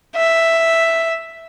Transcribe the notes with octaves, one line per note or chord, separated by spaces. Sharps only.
E5